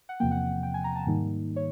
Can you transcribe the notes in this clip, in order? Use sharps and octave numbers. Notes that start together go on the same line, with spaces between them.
F#5
E2 C3 F3 A#3 G5
F#5
G5
G#5
A#5
A5
G#2 D#3 G3 A#3 D#4
C#5